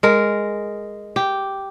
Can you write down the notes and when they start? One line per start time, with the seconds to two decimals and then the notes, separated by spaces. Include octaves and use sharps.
0.03 G#3 A#4
1.16 G4